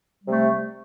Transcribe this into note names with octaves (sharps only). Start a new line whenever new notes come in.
C3 G3 A3